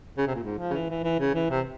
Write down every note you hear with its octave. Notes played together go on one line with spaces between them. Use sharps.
C#3
C3
A#2
G#2
F3
C#3
E3
E3
E3
C#3
E3
C3